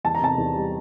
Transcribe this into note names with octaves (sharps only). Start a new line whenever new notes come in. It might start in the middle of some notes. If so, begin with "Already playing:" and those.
E2 A5
A#5
C3 A5
E2
G3